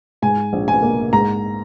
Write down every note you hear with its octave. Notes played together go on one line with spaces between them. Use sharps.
G#2 G#5
A#1
G#5
A#3
G#2 A#5